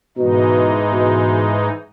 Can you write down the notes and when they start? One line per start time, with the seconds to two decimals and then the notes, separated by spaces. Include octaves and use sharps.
0.17 G#2 B2 E3 G#3 D#4
0.93 B2